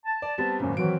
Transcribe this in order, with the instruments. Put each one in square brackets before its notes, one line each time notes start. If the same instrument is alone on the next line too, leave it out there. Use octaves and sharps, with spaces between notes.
[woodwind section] A5
[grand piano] D5
G3 B3 C4
[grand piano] G#1 F#2 A#2 [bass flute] C#4
[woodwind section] D#3 E3 [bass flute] F#3 [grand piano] C4 D7